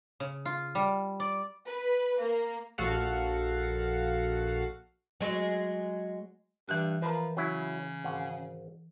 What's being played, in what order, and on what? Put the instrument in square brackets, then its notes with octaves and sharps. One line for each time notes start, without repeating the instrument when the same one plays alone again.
[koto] C#3
F4
G3
D5
[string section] B4
A#3
[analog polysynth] A#1 F#4 A4 F5 F#5
[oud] F#3 G#3
[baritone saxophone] G2 [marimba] E3 F#6
[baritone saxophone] F3 [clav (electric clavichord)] A#4 B4
[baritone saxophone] C#3 [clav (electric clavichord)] F#3 E4
[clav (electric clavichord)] G#1 F5 F#5